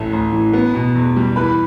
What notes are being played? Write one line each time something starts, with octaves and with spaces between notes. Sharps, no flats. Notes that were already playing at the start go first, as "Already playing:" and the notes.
Already playing: A1 A2 A3
A1
E3
B3
B2
E2
G3
E3 B4 B5